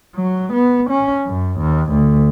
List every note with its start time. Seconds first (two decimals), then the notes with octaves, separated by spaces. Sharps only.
0.16 F#3
0.53 B3
0.90 C#4
1.27 F#2
1.59 D#2
1.91 D2